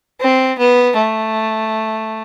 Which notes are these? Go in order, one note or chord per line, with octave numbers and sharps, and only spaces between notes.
C4
B3
A3